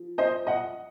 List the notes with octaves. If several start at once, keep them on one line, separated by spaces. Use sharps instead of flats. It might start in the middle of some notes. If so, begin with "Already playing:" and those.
Already playing: F3
C5 D#5
D#5 F#5